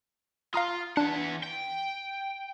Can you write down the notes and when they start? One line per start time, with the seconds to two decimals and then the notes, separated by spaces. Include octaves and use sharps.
0.54 F4 F5 A#5 D#6
0.97 E3 D4 F#5
1.43 G5